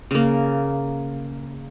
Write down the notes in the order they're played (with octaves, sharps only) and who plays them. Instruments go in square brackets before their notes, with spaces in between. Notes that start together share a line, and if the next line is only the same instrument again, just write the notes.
[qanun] C#3 A#3